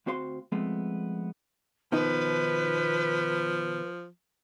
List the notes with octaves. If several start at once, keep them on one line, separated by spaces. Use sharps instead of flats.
D2 C4 F#4 C5 F5 C6
F3 G#3 A3 B3 C4
B2 D#3 F3 D#4 B4